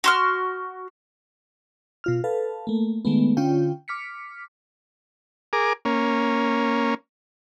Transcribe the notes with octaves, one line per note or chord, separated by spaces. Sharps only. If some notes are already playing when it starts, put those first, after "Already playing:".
F#4 C6 F6
B2 F4 F6
A4 B4 F5 A5
A3 A#3
D#3 G#3 A3 B3
D3 C#4 F4 G5
D6 F6 B6 C#7
G#4 A#4 D6
A#3 C#4